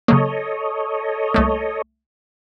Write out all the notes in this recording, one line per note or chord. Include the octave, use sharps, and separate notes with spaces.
C#3 F#3 A#3 A4 C#5 D#5
C2 A3 A#3